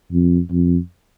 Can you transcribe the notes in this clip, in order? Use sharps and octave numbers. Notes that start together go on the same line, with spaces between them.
F2
F2